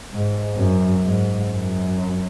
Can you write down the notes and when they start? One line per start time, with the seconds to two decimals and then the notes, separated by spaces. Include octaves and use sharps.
0.11 G#2
0.56 F#2
1.03 G#2
1.48 F#2